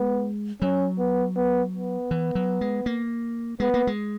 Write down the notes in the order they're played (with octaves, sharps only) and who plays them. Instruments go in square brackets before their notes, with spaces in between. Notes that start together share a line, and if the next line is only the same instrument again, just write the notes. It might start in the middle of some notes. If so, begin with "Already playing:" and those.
Already playing: [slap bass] G#3 [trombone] B3
[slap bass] F#3 [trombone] C#4
[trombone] B3
B3
B3
[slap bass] E3
F#3
G#3
A#3
[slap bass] G#3 [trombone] B3
[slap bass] A#3
G#3